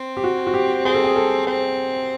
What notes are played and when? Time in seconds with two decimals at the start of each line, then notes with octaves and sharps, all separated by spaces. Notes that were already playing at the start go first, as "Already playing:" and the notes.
Already playing: C4
0.17 G4
0.24 F#4
0.47 F#4
0.54 G4
0.85 C4 G#4
0.94 A4
1.04 G#4
1.16 A4
1.47 C4